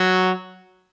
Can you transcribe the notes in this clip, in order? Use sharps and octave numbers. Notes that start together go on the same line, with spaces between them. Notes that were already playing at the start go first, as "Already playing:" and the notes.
Already playing: F#3